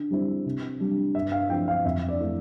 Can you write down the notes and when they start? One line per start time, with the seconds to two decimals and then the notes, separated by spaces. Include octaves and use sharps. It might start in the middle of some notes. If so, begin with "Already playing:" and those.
Already playing: D3
0.11 G3 C4 E4
0.46 C3
0.80 G3 D4
1.15 G2 E5
1.32 F5
1.49 F3 C4 E4 G5
1.68 F5
1.85 F2 E5
2.08 D5
2.20 E3 A3 E4